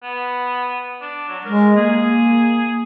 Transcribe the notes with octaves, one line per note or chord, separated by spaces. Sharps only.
B3
D4
F#3
G#3 A#4
A#3 G#4